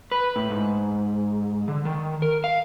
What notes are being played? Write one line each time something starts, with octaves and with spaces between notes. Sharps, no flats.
B4
A2
G#2
D3
D#3
A#4
F5